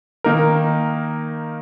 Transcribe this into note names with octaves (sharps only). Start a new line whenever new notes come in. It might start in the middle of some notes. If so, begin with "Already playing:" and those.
D#3 A#3 D#4 A#4